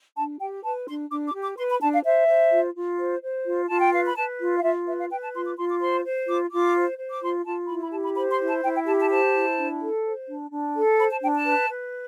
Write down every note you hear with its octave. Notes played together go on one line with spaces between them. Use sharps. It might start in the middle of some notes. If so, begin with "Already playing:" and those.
D4 A5
G4 G5
B4 A5
D4 C6
D4 D6
D6
G4
D6
B4 C6
B5
D4 A5
F5
C5 E5
C5
F4
F4
C5
C5
F4
F4 A5
G5
B4 F5
B5
B4 A5
F4
F5
F4 E5
B4 E5
F5
B4 G5
A5
F4 C6
D6
F4 C6
D6
C5 C6
C5
F4 D6
F4 D6
C5
C5
D6
F4 C6
F4 A5
E4 B5
B5
G4 A5
B5
C5 B5
C6
E4
A5
E4 G5
G5
G4 A5
A5
C5 A5
E4
D4
A4
C5
D4
D4
A4
C5 B5
A5
D4 G5
A5
B4
B4